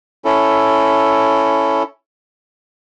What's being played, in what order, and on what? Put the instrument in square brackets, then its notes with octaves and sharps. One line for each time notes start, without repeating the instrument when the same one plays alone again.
[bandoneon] C#4 E4 A4